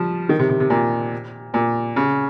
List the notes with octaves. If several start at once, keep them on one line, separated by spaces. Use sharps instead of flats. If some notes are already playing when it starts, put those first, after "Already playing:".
Already playing: F3 G3
D#3
C3
C3
C3
A#2
A#2
C#3